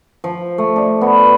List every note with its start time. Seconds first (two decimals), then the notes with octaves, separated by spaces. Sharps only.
0.24 F3
0.58 A3
0.76 D4
1.01 B3